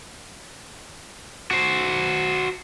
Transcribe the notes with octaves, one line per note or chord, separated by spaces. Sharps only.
F#4 C5